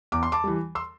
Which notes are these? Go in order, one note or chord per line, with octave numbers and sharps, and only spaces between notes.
E2 D6
C6
A5 D6
E3 G3
C6 E6